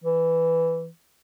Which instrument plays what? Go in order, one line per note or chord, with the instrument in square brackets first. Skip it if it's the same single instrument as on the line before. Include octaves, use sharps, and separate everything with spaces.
[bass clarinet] E3